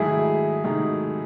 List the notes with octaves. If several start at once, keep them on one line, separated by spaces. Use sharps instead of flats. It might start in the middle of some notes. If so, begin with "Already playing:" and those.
Already playing: G#2 D#3 F#3 A3 D#4 E4 G#4
G#2 D#3 F#3 A3 D#4